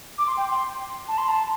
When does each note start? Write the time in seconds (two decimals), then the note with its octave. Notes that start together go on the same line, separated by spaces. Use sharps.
0.18 D6
0.27 C6
0.37 G5
0.48 C6
1.08 A5
1.18 C6
1.29 A5